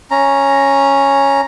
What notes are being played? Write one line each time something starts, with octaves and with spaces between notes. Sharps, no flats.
C#4 A#5